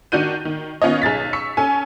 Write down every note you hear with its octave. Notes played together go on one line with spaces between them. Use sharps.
D#3 D4 F#4 G6 D#7
D#3
D#3 B3 C#4 F4 C#5 D#5
B1 G#4 A6 B6
C#6 E6 B6 C#7
C#4 A4 G#5